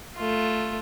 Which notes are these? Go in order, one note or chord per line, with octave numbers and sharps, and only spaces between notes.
A3 F4